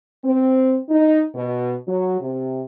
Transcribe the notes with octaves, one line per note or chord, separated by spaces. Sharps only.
C4
D#4
B2
F#3
C3